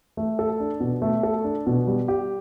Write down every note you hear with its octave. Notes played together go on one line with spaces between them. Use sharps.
A3
A4
D4
B2
A3
A4
D4
B2
G3
G4